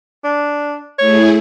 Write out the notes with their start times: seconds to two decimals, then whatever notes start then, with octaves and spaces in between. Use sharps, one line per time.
0.24 D4
0.99 A3 E4 G#4 C#5